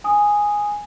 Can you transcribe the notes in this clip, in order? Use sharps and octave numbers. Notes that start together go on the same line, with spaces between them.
G#5 D#6